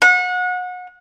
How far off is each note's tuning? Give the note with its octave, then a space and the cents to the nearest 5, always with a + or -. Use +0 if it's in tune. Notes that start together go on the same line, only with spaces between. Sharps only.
F#5 -30